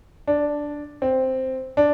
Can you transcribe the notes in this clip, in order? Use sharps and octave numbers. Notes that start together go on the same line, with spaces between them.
D4
C4
D4